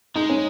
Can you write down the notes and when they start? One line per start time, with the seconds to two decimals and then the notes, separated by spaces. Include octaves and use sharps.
0.15 G#3 D#4
0.30 C#4